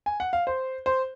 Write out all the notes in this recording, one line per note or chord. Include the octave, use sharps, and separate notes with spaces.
G#5
F#5
F5
C5
C5